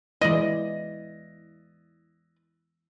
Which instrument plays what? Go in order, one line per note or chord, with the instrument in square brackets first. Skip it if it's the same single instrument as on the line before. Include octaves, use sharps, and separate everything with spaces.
[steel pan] E3 G#3 E4 [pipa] D5 D#5 [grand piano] A#6